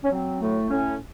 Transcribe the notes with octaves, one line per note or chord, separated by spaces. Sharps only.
C#4
F#3 C4
A2 A3
A2 C#4